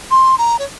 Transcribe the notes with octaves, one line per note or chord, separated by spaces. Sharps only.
C6
A#5
C#5